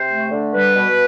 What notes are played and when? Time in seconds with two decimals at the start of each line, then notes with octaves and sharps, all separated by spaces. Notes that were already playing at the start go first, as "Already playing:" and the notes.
Already playing: C3 C5
0.09 A3
0.32 D3
0.53 G3 B4
0.75 B2